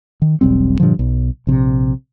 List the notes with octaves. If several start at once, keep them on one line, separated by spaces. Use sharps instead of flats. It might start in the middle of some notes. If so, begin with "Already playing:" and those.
D#3
E1 B1 G3 C4
G2 A#2 D3 F3
B1
A#1 C3